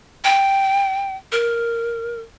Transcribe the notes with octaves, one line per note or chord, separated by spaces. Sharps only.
G5
A#4